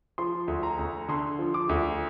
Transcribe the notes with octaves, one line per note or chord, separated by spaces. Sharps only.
F3 C6
D2
A#5
D2
D3 C6
F3
D6
D2